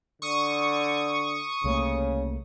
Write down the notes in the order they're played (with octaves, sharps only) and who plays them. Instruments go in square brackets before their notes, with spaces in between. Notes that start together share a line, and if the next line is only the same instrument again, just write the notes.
[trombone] D3 [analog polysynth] C#6 D#6
[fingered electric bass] C2 A3 A#3 [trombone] C#3